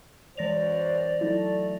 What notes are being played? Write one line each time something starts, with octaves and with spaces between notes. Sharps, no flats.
F#2 E3 C5 D5 A#6 F7
F#3 A3 D#4 E4